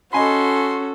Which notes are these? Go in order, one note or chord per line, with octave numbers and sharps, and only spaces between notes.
C#4 F#4 A4 D#5 G#5 B5 C6